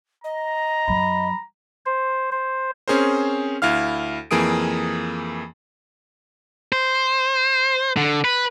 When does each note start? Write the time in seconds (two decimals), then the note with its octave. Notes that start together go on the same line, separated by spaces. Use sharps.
0.24 D#5 A#5
0.88 F#2 F#3 B5
1.86 C5
2.32 C5
2.88 C4 C#4 G#4 A#4 C5
3.62 D2 E4 F5 F6
4.31 F2 E3 A#3 G#4 D#6 D7
6.72 C5
7.97 D3
8.25 B4